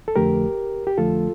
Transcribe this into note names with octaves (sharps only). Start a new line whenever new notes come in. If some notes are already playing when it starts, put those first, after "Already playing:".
A4
F2 D3 F3 A3 G4 A#4
G4
F2 D3 F3 A3 F4 A4